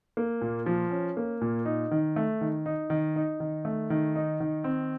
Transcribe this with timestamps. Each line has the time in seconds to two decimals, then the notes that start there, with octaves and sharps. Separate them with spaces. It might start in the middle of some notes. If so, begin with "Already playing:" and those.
0.17 A#3
0.41 A#2
0.66 F3
0.91 C#4
1.17 A#3
1.41 A#2
1.65 D#4
1.91 D#3
2.16 A3
2.41 D#3
2.66 D#4
2.90 D#3
3.16 D#4
3.40 D#3
3.65 A3
3.90 D#3
4.15 D#4
4.40 D#3
4.64 C4